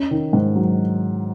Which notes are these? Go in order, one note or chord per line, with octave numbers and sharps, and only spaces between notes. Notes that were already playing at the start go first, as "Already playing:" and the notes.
Already playing: C#4
D#3
G#2
F#3